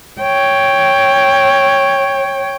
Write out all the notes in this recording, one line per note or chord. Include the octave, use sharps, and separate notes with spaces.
C#5 G5